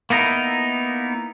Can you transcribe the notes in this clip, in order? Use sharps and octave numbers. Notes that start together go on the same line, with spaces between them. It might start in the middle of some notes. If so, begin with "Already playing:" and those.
A#3 B3 D#4 E4 A#4